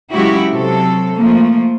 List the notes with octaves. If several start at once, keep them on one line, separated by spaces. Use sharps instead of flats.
C#3 F#3 G#3 E4 F#4 G4
C3 F#3 A4
F3 A3 A#3